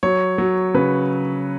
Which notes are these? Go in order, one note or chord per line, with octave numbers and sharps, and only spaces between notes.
F#3 C#5
F#3
C#3 B4